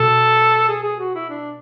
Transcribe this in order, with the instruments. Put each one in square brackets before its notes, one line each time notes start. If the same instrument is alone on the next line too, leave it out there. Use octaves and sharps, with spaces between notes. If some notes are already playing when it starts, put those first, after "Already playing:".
Already playing: [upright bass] B2 [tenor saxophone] A4
[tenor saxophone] G#4
G#4
F#4
E4
D4